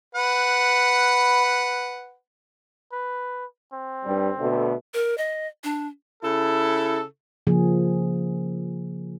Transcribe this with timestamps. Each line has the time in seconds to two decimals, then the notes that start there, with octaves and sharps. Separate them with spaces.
0.15 B4 F#5
2.92 B4
3.73 C4
4.05 G2 G3
4.39 B2 D3 A3
4.94 A#4
5.18 D#5
5.64 D4
6.24 C#3 E4 A4
7.47 C#3 F3 A#3 G#4